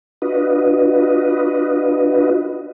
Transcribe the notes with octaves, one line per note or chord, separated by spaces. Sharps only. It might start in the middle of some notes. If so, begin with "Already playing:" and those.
D4 F4 F#4 B4 D#5